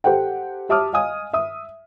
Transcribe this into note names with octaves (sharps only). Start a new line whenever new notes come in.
G4 A4 C5 F#5 G5
G4 E5 A5 D6 D#6 F6
D#5 F5 G#5 D#6
E5 D#6